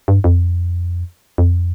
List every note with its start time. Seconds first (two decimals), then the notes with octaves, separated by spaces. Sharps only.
0.08 G2
0.24 F2
1.38 F2